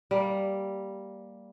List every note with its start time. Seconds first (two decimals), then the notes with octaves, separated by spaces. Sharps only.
0.11 G3 A#3